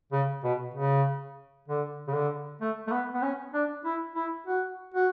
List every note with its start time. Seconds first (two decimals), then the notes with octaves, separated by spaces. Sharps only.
0.12 C#3
0.44 B2
0.74 C#3
1.68 D3
2.08 C#3
2.14 D3
2.61 A3
2.88 A3
2.92 B3
3.14 B3
3.22 C#4
3.54 D4
3.85 E4
4.15 E4
4.47 F#4
4.94 F#4